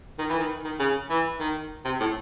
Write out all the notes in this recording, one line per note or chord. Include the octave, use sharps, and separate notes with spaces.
D#3
E3
D#3
D#3
C#3
E3
D#3
C3
A2